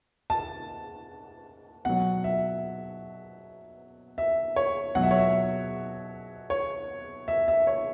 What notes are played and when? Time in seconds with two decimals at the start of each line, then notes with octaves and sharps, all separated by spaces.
0.30 A5
1.85 B2 F#3 F#5
2.24 E5
4.18 E5
4.56 C#5
4.95 B2 F#3 F#5
5.03 E5
5.11 C#5
5.18 E5
6.50 C#5
7.28 E5
7.48 E5
7.67 C#5